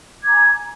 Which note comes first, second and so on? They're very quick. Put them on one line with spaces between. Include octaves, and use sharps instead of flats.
D6 G#6 A#5 G#5